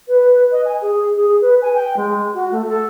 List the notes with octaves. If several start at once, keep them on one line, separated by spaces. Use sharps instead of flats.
B4
D#5
G#5
G#4
G#4
B4
G#5
G5
G#3
F#4
A3
A4